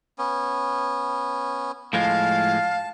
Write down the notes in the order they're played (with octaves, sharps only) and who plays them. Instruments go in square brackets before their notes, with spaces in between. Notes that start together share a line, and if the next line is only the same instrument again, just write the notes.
[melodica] B3 C#4
[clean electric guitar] A2 F3 G#3 [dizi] F5 [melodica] A5